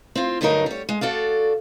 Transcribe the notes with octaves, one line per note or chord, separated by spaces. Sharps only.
C4 F4
D2 G2 D3 F#3 D#4 A#4
G3 C#5
G#3
F#4 A4 D5 F5